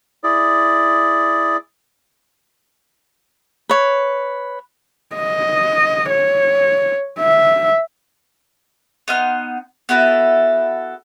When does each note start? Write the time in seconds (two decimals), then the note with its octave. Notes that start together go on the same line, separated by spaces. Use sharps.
0.24 E4 G#4 D5
3.69 B4 C#5
5.16 D#5
6.10 C#5
7.20 E5
9.08 B3 D#4 C6 F6
9.89 B3 E4 F#4 A4